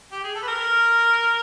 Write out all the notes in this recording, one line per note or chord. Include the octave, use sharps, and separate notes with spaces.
G4
G#4
A4
B4
A#4